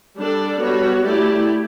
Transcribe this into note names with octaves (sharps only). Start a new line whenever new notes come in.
G3 D4 A4 D5
G3 B3 F#4 C#5
A3 E4 G4 D5